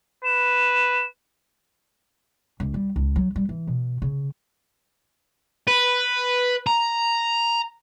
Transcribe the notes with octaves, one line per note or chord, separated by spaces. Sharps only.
B4 E7
C#2
G3
C#2
F#3
G3
E3
B2
C#3
B4
A#5